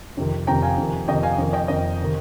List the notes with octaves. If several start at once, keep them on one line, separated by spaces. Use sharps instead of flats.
F2 C3 D#3
F2 C3 D#3 G5 A#5
F5 G#5
F2 C3 D#3
F2 C3 D#3 D#5 G5
F5 G#5
F2 D#3
D#5 G5
F2 D#3 D#5
C3 D#3